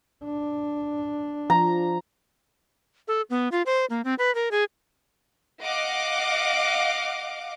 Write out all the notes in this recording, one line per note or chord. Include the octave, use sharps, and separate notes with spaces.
D4
F3 A#5
A4
B3
F4
C5
A#3
C4
B4
A#4
G#4
D#5 F5 F#5 D6